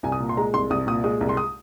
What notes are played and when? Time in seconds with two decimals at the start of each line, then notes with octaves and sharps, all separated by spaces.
0.03 C2 G#5
0.12 D#6
0.20 A#2
0.29 C6
0.37 G#3 A#5
0.54 C2 C6
0.70 C2 D#6
0.87 A#2 D#6
1.04 G#3 D#6
1.21 C2
1.29 C6
1.37 D#6